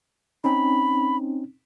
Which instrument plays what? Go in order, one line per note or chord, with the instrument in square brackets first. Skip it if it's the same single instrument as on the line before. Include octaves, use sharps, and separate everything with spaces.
[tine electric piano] C4 C#4 D#4 [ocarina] B5